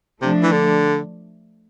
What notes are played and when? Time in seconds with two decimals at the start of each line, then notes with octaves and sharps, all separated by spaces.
0.21 C3 F3 A3 D4
0.43 E3
0.52 D3